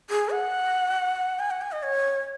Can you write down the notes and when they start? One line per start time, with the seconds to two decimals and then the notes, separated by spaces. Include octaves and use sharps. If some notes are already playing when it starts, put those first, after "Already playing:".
0.10 G#4
0.32 F#5
1.39 G#5
1.51 F#5
1.61 G#5
1.72 D#5
1.83 C#5